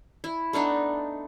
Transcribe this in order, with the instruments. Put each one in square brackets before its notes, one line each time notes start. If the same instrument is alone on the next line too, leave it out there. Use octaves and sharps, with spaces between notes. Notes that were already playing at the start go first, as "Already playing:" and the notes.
[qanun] E4
A3 B3 D4 D#4